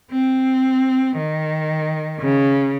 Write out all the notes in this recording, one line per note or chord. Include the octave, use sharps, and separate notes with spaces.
C4
D#3
C#3